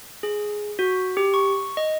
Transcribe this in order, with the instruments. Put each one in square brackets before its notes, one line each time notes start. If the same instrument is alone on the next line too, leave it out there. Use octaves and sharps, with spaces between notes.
[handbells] G#4
F#4
G4
C#6
D#5